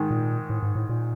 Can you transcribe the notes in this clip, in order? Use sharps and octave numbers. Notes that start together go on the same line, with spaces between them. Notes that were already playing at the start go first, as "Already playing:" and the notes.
Already playing: G#2 D#3 G#3
A#2
A2
G#2
A2
A#2